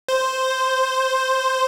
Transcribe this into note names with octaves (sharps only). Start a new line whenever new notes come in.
C5